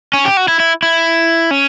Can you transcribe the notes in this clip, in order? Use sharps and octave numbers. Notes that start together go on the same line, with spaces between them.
C#4
G4
F#4
E4
E4
E4
C#4